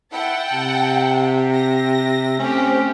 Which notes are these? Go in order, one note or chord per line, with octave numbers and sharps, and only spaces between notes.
E4 F#5 G5 A5
C3
A#6
A3 C4 C#4 G4